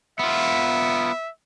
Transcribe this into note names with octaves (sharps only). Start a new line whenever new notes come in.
B3 F4 E5